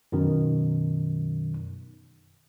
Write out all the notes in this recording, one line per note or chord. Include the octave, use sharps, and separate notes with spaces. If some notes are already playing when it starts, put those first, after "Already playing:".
F#2 B2 D#3